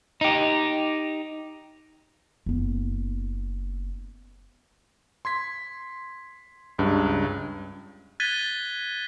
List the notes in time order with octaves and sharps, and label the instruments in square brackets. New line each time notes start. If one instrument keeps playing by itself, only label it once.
[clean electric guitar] D#4 G4
[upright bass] F#1 B3
[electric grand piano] C6 G#6 B6
C#2 G2 C#3
[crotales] F#6 G#6 A6 B6 D#7 G7